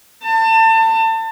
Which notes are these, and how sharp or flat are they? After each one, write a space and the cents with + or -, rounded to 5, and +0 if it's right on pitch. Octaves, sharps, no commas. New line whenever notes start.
A5 +30